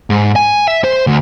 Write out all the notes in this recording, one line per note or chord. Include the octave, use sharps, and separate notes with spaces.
G#2
G#5
E5
C5
D2